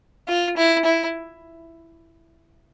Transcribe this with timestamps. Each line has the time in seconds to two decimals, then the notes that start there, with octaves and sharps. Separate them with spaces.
0.28 F4
0.57 E4
0.85 E4